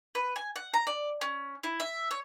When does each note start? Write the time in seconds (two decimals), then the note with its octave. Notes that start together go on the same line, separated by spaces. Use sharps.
0.15 B4
0.36 G#5
0.56 F#5
0.74 A#5
0.87 D5
1.21 C#4
1.63 E4
1.80 E5
2.11 C#5